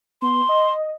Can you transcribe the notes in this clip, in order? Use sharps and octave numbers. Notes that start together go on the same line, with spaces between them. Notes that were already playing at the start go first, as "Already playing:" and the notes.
B3 C6
D#5